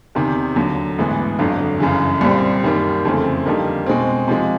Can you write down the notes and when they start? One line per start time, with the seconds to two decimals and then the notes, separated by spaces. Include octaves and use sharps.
0.15 E2 C3 D#3
0.56 D#2 D3 F#3
0.98 A1 G#2 E3 G#3 B3
1.39 G1 F2 D3 F#3
1.80 G1 F#2 C#3 E3
2.21 C2 A#2 G3 C4
2.63 F#2 D#3 G3 A#3
3.05 F2 C#3 E3 A3 C4
3.46 F2 D3 G3 A#3 D#4
3.86 B2 G#3 C4
4.28 C3 F3 G#3